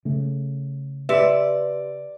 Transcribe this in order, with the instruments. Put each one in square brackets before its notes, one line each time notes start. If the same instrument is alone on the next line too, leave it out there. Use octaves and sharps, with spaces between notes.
[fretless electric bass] C#3 A3
[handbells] G4 B4 [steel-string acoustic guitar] D5 [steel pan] E5